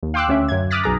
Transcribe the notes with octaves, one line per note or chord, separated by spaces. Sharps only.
D#2
F5 G5 C6 D6 E6 F#6
D2 C#4 E5
F#2 G#6
D6 D#6 F6 F#6 A6 B6
B1 G#4 A#5